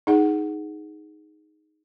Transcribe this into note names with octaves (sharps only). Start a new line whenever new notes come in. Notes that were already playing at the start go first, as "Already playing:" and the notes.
D#4 G#4 F#5